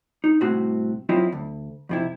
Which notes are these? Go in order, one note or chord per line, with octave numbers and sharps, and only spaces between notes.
D#4
C2 A2 C4 F#4
F#3 C4 E4 F4 D#5
D2
F2 C3 E4